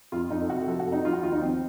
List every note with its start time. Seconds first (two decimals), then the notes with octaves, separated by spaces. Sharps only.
0.12 F2 F4
0.30 F2 D#4
0.42 A4
0.49 C3 F#4
0.67 F3 A4
0.80 F#4
0.86 F2
0.92 D#4
1.05 F3 F4
1.13 F#4
1.23 D#2 F4
1.33 D#4
1.42 F3 C4